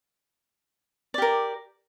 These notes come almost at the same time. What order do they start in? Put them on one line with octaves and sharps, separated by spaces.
D5 G4 A#4